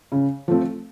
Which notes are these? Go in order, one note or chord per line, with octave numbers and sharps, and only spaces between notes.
C#3
F3 A3 C4